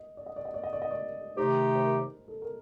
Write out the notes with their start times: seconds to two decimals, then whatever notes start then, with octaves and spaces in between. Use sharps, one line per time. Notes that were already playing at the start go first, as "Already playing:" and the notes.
Already playing: D#5
0.17 D5
0.26 D#5
0.36 D5
0.45 D#5
0.54 D5
0.63 D#5
0.73 D5
0.82 D#5
0.91 D5
1.37 C3 D#3 A3 D#4 G4 C5
1.68 A#4
1.75 C5
1.84 A#4
1.97 C5
2.28 A4
2.42 A#4